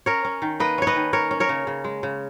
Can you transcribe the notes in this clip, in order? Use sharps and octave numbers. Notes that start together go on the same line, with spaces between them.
C#4 A#4 C#5
C#4
D#3
A#3 B4 D#5
C#4 C#5
B4 D#5
D#3
C#4 A#4 C#5
C#4
A#4 C#5
C#3
C#3
G#3
C#3